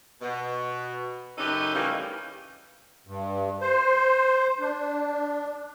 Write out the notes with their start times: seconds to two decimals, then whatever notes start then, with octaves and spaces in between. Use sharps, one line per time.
0.21 B2
1.38 F#2 C#3 D#4 G4 A4 B4
1.74 A2 C#3 E3 G3 A#3 D#4
3.07 G2
3.61 C5
4.60 D4